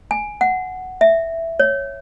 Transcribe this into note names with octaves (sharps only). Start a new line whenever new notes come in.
G#5
F#5
E5
C#5